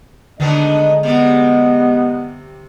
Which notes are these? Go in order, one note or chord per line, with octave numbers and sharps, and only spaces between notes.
B2 D3 D#3 G#3 B3 D4 D5 D#5
C3 G3 B3